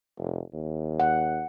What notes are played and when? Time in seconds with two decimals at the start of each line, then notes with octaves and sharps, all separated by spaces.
0.18 F1
0.53 D#2
1.00 F#5